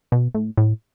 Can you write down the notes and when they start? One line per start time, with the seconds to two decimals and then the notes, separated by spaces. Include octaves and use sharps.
0.12 B2
0.35 A2
0.57 A2